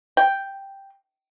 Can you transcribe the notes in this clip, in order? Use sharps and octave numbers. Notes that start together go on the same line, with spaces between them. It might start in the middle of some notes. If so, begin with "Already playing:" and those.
G5